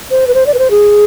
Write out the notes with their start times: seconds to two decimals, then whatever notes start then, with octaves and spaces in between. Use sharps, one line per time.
0.11 C5
0.27 B4
0.34 C5
0.46 D5
0.54 B4
0.59 C5
0.71 G#4